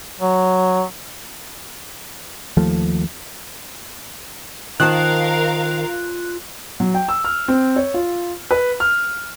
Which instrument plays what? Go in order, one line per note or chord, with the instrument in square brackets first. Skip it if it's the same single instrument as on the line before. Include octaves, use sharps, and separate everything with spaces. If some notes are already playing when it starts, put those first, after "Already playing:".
[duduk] F#3
[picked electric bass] D#2 F3 A3
[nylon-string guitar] D#3 C5 A5 [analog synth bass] F4 [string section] A#4 F5 A#5 [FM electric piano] F#6
[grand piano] F#3
G5
E6
F6
C4
C#5
F4
B4
F6